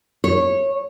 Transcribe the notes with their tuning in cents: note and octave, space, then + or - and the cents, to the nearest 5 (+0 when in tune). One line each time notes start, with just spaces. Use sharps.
C#5 -15